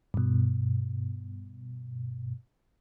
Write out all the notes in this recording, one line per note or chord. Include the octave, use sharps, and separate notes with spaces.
G2 B2